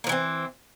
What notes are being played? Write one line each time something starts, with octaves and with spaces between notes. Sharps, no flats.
E3 F3 A#3 C4